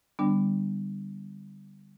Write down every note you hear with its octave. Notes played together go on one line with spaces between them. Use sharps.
D3 G3 B3 D4